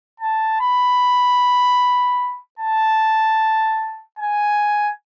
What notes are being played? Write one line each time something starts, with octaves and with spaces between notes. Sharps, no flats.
A5
B5
A5
G#5